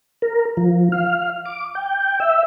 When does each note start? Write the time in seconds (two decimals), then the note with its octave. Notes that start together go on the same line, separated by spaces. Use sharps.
0.22 A#4
0.57 F3
0.92 F5
1.46 D6
1.75 G5
2.20 E5